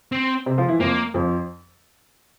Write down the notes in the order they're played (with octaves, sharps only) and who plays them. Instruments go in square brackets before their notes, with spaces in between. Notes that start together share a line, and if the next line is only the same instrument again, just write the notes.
[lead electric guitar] C4
[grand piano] C3 C4
F3 F4
E3 E4
[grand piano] F2 F3 [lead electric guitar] A#3
[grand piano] F2 F3